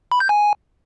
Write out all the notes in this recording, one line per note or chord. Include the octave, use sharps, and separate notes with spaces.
B5
G6
G#5